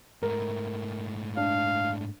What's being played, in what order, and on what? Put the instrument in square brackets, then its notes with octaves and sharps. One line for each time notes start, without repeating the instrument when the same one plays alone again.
[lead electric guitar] G#2 A3 [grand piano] A#4
[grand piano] D4 [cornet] F5